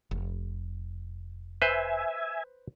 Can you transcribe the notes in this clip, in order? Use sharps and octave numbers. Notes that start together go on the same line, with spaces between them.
F1
B4 C5 E5 G#5